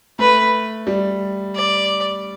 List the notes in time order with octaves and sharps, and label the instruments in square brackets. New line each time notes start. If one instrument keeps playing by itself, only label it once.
[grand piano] A3 [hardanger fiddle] B4
[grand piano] G3
[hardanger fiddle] D5